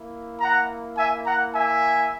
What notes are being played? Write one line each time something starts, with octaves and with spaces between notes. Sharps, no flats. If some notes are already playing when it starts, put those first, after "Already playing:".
Already playing: A#3 E4
F#5 A#5
E5 G#5
F#5 A#5
E5 G#5